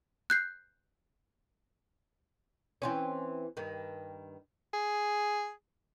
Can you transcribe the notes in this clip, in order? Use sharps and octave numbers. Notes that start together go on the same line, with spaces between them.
F#6 G6 C7
E3 C4 C#4
G2 D#3
G#4